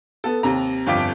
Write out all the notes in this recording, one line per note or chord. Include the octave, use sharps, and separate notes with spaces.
B3 A4
D#2 C3 A#5
G1 F2 F4 G5 D6 B6